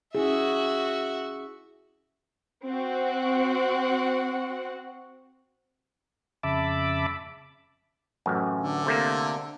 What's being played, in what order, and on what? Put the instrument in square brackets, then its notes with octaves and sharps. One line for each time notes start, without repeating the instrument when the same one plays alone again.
[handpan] C#4 E4 G#4 [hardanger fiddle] F#4 E5
[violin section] C4 F#4 F#5
[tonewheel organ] F2 C#3 E5 A5 B5 D6
[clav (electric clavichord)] A1 F#2
[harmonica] D3
[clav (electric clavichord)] C3 A3 A#3